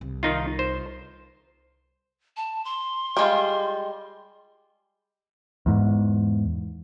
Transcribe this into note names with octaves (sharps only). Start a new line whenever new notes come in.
C2
D#3 D#4 F4
C5
A5
C6
G3 G#3 F4
E2 G#2